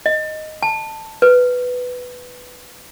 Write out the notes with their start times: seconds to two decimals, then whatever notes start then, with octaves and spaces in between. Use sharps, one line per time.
0.06 D#5
0.63 A5
1.22 B4